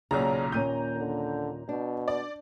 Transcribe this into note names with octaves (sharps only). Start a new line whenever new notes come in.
B1 A#2 C#3 G#4 C#5 D5 A#5
D#2 A#2 C#4 G6 D#7
D3
B2 D4
D5